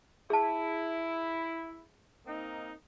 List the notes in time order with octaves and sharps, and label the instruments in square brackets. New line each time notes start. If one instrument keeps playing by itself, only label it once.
[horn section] E4 [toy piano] G#4 A5
[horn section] A#3 C4 D#4